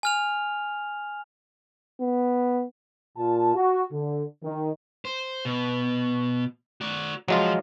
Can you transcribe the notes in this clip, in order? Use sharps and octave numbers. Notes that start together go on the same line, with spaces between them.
G#5 F6 F7
B3
A#2 F4 A5
F#4
D3
D#3
C5
B2
F#4 D5
F3 F#3 G#3 F4